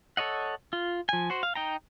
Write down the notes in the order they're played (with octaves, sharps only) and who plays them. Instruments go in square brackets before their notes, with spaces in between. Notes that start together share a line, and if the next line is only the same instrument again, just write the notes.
[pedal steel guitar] A4 C#5 D#5 F#5
F4
F3 G#5
F#4 C5
F5
D#4 G5 A#5